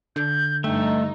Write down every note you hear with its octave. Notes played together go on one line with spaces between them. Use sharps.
D3 G6
G2 A3 D#4 G5